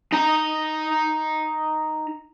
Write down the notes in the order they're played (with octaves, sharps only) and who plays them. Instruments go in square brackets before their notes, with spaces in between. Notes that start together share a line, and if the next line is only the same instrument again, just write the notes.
[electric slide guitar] D#4 A#5